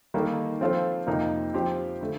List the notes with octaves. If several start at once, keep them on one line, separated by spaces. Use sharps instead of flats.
D#3 G3 A#3 D#4 A4
F3 C4 F4 A4 C5
F2 C3 F3 A#3 D#4
F3 C4 G4 C5
D3 A3